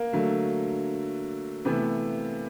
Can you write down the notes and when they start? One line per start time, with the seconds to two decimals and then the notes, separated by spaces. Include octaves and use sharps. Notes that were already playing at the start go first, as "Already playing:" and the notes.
Already playing: A#3
0.13 D3 F#3 A3
1.65 C3 E3 A3 B3